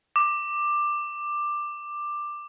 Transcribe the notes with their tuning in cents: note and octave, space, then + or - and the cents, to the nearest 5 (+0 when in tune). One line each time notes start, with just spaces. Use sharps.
D6 +10